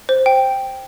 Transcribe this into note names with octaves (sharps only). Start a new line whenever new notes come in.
C5
G5